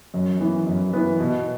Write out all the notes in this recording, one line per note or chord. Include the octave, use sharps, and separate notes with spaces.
F#2
E3 B3
F#2
E3 B3
B2